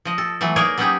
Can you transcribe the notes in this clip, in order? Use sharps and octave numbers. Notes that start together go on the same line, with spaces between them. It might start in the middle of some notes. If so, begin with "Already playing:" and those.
F3 D#5
A4
E3 F#3 A3
A#3 D#4 G#4 A#4 C#5 D5
F#3 B3 C#4 D#4 G4 G#4